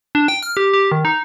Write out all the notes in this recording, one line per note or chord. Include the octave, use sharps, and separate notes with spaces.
D4
G5
F6
G4
G4
D#3
D#4